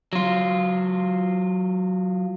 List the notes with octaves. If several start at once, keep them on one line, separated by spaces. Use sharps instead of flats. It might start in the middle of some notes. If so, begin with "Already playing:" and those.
F#3 F4